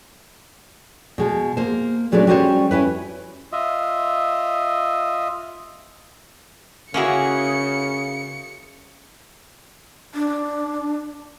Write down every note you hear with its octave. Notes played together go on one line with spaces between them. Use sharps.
B2 G#3
A#3 C5
A#2 F#3 G#3 A3 C#4 D4
G3 C#4 F#4 A4 C5 C#5
C#4 E4 B4
F4 D#5 E5
C#3 A#3 C#4 E4 F#4 G#4 C#7
D4